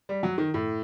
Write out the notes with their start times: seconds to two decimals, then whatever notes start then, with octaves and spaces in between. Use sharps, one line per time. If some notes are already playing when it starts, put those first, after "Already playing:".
0.09 G3
0.23 F#3
0.38 D#3
0.54 A2